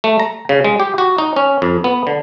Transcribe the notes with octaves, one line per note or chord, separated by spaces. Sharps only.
A3
A#5
C#3
G#3
G4
F#4
D#4
C#4
F2
B3
D3